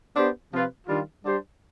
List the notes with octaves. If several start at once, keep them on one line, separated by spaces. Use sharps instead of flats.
B3 D4 G4 C5
C3 F3 C4 F4 B4
D#3 G3 D4 F4
G3 D4 G4 C5